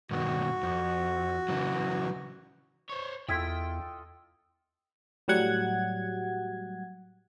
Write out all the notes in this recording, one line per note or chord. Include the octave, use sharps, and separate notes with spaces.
G2 B2 D#3 F#4
F2
C#3 E3 F#3
C5 C#5
E2 E4 F4 A4 D#5 G5
A2 F#3 G3 F#5 G#6